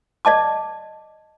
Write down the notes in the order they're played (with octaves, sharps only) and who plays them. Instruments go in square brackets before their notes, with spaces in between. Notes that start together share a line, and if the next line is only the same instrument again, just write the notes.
[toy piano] D5 D#5 A5 D6